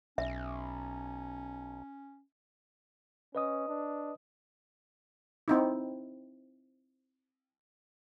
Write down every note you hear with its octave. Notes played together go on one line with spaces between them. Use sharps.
B1 C#4 E5
C#4 B4 D#5 D#6
D4
C4 D#4 E4